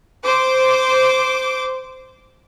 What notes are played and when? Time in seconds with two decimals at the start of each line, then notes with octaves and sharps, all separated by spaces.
0.24 C5 D6